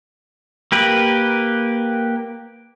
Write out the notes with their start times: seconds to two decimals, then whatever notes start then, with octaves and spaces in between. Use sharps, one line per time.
0.72 A#3 G4 B4